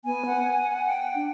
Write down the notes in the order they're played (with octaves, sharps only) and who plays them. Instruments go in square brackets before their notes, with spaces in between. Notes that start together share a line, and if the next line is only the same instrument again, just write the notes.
[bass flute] B3 [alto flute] G#5
[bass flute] F#5
[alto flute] G5
[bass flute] D4